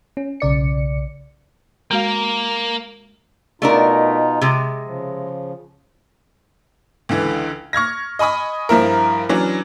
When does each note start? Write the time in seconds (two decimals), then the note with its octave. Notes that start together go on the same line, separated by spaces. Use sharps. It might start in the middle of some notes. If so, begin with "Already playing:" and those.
0.17 C#4
0.40 B1 C#3 D5 C#7
1.91 G#3 A#3 F#4 F5
3.62 B2 A3 D4 D#4 F4 A#4
4.41 C3 G#3
4.86 C#3 F3
7.09 C#2 D3 E3
7.73 C#6 F6 G#6 A#6
8.19 D#5 G#5 B5 C#6 D#6
8.69 G2 F3 E4 A#4
9.29 E3 F#3 C#4 D4